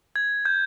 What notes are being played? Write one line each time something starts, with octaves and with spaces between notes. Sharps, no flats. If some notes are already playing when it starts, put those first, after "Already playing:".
G#6
G6